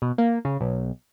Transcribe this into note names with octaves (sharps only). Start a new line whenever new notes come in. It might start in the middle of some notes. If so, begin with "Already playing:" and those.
B2
A#3
C#3
B1